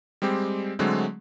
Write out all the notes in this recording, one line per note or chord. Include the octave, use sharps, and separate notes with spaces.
G3 G#3 C4 G4
D3 F#3 G#3 A3 C4